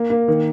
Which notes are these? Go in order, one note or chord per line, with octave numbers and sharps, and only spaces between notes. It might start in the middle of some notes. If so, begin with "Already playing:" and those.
Already playing: A#3
A#3
D#3